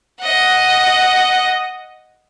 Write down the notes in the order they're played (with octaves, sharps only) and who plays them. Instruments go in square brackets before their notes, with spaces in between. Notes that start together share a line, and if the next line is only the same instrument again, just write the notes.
[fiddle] D#5 F#5